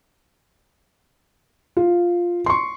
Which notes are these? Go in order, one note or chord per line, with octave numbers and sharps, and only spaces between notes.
F4
C6 C#6